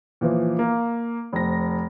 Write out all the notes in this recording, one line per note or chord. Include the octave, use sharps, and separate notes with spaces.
A#2 E3 F3
A#3
F1 C4 A#6